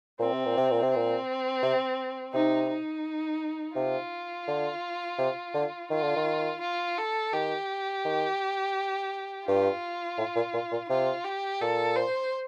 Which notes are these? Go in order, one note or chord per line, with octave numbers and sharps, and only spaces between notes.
A#2 C4
C3
A#2
C3
A#2
C3
C4
A#2
C3
C3 D#4
D#4
C3 F4
D3
C3
D3
D#3 F4
D3
D#3
F4
A4
D#3 G4
D#3
G2 F4
A2
A#2
A#2
A#2
C3 F4
G4
A#2 A4
C5